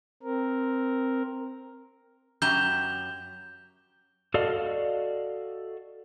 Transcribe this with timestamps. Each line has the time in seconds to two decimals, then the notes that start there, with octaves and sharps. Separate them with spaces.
0.23 C4 A#4
2.42 F#2 G4 A#5 G6 E7 G7
4.34 F#4 A4 D5 D#5 F5